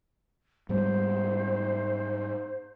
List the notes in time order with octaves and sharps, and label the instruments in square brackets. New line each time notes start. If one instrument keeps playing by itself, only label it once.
[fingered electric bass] G#2 G3 B3 [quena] C5